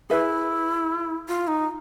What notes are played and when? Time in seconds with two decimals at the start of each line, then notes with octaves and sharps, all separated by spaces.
0.10 E4 G#4 B4 E5
1.28 F4
1.47 D#4